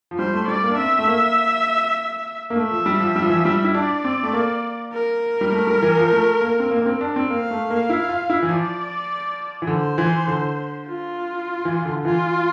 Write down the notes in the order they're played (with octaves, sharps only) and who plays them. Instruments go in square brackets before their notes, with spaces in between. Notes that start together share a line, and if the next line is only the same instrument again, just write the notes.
[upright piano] F3
[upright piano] G3 [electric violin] C5
[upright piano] A3
[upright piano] G3 [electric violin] D5
[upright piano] A#3
D4
[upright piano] C4 [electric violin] E5
[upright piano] A3
A#3
A#3
[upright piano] A3 [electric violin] E5
[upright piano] F3
G3
F3
G3
F3
E3
F3
G3
E4
[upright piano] D4 [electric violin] D5
[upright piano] C4
A3
A#3
[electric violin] A#4
[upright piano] G3
A3
G3
E3
F3
A3
A#3
C4
A#3
A#3
C4
D4
C4
[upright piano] A#3 [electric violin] F5
[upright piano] A3
A#3
E4
F4
E4
E3
[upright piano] F3 [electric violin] D5
[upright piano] E3
[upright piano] D3 [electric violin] C5
[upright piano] E3
D3
[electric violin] F4
[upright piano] E3
D3
[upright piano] E3 [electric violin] F4